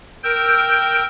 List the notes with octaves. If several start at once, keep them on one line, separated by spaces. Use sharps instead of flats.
A#4 G5 E6 G6